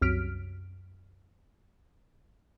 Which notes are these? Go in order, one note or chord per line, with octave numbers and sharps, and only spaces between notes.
C2 F#2 F6 B6 D7